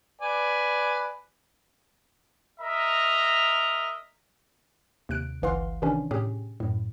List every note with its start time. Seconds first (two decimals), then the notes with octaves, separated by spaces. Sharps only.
0.21 B4 D5 G#5
2.60 A#4 D#5 E5 A#5
5.09 D#2 C3 F#6 D7
5.42 G1 C#2 E3 F5 F#5 C6
5.82 C3 D#3 E3 C#4 D4
6.11 A2 C3 C#4 G4 G#4
6.60 F#2 A2